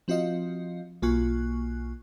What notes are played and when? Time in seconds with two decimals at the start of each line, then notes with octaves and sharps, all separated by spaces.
0.08 F3 C4 F4 F#4 D#5 F5
1.02 B1 A#3 F4 G#5 C#6 F#6